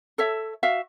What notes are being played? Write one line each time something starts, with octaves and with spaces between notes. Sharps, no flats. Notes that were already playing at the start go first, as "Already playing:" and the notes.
A4 C#5 E5
F#4 E5 F5